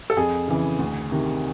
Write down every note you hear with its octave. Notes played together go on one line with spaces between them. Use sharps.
A4
F2 G#4
C#3 E3
D2
C3 D#3